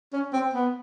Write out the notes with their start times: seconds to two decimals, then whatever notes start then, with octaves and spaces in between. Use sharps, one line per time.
0.13 C#4
0.33 C4
0.53 B3